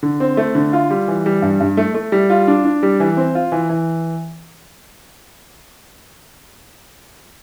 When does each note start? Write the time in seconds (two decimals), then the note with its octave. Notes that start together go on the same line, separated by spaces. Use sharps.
0.03 D3
0.20 C4
0.37 A3
0.55 D3
0.73 F4
0.90 G3
1.08 E3
1.26 G3
1.42 G2
1.61 G2
1.77 A3
1.94 A3
2.12 G3
2.30 F4
2.47 D4
2.65 D4
2.83 G3
3.00 E3
3.17 C4
3.35 F4
3.52 E3
3.70 E3